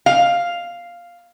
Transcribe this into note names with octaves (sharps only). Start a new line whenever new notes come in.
F5